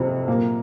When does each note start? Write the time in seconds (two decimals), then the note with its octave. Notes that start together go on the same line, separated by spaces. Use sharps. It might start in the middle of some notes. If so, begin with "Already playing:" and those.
Already playing: F2 C3 F3 C4
0.28 A#2 A#3